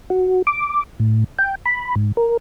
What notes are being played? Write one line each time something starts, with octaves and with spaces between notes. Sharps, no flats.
F#4
D6
A2
G5
B5
G#2
A#4